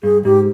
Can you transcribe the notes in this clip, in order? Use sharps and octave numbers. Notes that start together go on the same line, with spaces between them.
G2 G#4
G#2 G4